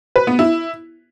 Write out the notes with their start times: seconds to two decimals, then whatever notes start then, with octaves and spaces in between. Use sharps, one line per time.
0.16 B4
0.27 B3
0.39 E4